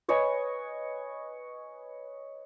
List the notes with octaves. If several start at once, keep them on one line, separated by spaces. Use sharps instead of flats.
B4 C#5 D#5 G#5